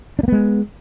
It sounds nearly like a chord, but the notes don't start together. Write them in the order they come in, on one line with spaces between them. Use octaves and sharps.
D4 A#3 B3 G#3